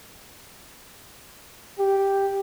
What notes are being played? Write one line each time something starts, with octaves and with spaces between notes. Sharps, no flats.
G4